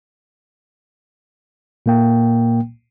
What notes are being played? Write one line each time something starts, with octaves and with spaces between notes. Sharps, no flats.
A#2 A#3 G5